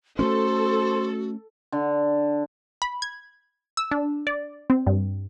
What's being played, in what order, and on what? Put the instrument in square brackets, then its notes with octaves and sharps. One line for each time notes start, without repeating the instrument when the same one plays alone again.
[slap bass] A3 A#3 C#4 [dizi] F#4 [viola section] A4 [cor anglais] C5
[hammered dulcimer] D3
[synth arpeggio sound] B5
G#6
E6
D4
D5
C4
G2